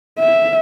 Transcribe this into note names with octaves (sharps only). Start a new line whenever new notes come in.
E5